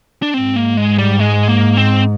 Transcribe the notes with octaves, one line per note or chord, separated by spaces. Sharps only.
D4
G#2 C4
A#3
G#3
G3
G#3
A#3
C4